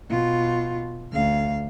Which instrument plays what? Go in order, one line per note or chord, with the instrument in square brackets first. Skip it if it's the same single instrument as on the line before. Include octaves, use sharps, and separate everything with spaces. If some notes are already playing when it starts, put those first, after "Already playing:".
[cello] B2 F4
D2 F5